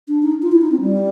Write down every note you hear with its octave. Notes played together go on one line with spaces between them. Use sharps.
D4
D#4
F4
E4
D#4
C4
G3